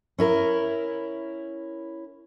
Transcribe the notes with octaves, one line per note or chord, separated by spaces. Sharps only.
C#4 E4 A#4